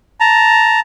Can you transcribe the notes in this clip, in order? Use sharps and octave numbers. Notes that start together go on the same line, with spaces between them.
A5 A#5